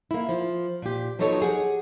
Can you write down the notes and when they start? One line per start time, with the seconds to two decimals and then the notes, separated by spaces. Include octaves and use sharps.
0.11 A#3 E4
0.29 F3
0.82 A#2 G4
1.19 F3 F#3 B3 D#4 A4 C#5
1.41 G4 G#4 F#5